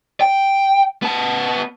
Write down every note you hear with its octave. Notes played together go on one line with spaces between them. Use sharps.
G5
B3 A5